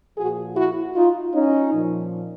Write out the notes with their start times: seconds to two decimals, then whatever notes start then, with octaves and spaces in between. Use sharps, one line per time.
0.18 A#2 F3 F#4 G#4
0.56 E4 F#4
0.95 D#4 F4
1.34 C#4 D#4
1.73 A#2 F3